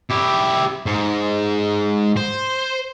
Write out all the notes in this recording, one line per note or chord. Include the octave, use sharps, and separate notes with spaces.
E4 G4
G#2
C5